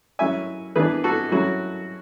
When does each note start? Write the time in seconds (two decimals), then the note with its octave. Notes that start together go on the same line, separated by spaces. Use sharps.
0.19 F#3 C#4 E4 E5 G#5
0.76 E3 B3 D4 G#4 B4
1.04 F#4 A4
1.32 F#3 C#4 E4 F#4